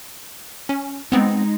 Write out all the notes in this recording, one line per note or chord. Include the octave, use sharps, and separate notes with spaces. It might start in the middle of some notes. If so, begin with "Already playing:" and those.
C#4
G#3 B3 C4 D#4